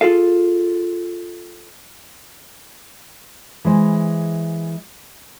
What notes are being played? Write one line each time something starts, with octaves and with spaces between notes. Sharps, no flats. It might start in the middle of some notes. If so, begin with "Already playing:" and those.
F4 G#4 A4 F5
E3 G#3 C5